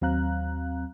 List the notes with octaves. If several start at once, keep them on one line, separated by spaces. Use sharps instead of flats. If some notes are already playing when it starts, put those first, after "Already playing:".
D#2 F#3 C4 F5 A#5 F#6